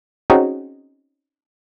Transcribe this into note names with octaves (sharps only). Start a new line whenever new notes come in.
C4 C#4 D#4 F#4 G#4